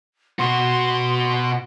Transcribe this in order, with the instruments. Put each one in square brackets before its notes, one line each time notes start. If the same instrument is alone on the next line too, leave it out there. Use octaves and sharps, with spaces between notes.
[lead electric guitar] B2 F#4 [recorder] C6